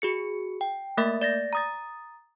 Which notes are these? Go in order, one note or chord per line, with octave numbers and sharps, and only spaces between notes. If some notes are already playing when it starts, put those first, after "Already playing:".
F#4 G#4 C#7
G5
A3 A#3 A#4 E5 A6
D5 A6 A#6
A#5 D#6 A6